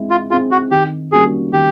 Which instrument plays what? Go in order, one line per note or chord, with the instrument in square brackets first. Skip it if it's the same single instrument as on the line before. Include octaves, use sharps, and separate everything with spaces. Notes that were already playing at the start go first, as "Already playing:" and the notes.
Already playing: [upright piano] G#3 C4 E4
[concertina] F4
[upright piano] C4 E4 G#4 [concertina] F4
[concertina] F#4
[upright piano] D#3 [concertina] G4
[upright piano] G3 A#3 C#4 F#4 [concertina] G#4
[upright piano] D#3 [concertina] G4